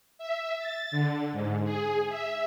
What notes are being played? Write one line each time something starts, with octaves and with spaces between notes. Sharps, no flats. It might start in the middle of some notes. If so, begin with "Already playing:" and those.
E5
A6
D3
G#2
G#4
E5